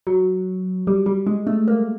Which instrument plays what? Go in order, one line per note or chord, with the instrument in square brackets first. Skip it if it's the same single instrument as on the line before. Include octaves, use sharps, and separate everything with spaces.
[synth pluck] F#3
G3
G3
G#3
A3
A#3